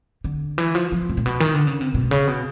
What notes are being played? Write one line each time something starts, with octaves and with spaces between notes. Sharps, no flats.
D3
E3
F3
F3
C3
A#2
B2
D#3
D3
C#3
C3
B2
C#3
B2